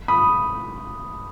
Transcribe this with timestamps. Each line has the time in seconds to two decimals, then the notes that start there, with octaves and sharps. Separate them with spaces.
0.08 B5 D#6